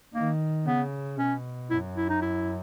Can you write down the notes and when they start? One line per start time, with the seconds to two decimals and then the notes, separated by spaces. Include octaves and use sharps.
0.14 D#3 A#3
0.66 C#3 B3
1.18 B2 C#4
1.70 F#2 E4
1.97 E4
2.09 D#4
2.22 E4